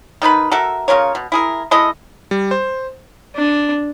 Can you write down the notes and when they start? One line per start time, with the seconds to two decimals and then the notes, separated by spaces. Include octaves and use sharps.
0.22 D#3 D#4 B4 B5
0.51 F#4 A4 A#4 E5
0.88 C#3 F4 A#4 C#5
1.15 B2
1.32 E4 G#4 A#4
1.71 G#3 E4 A4 D#5
2.31 G3
2.51 C5
3.35 D4